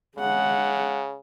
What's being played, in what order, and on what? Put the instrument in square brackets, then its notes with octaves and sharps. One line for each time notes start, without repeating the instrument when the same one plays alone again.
[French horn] C#3 [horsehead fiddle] G#3 F#5